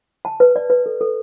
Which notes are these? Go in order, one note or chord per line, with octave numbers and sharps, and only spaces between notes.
A5
B4
D5
B4
A4
A4